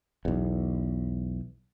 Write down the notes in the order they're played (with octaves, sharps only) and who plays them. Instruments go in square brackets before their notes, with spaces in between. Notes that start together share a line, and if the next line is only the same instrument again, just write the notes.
[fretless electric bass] B1 E2